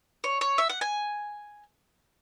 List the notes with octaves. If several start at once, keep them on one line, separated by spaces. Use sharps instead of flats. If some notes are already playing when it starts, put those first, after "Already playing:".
C#5
C#5
E5
F#5
G#5